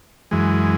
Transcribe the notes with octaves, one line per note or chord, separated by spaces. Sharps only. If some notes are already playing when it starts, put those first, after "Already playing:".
F#2 E3 G#3